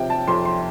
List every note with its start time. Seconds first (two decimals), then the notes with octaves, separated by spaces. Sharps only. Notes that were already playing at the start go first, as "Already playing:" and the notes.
Already playing: C3 F3 G5
0.10 A5
0.27 F2 C6
0.45 C6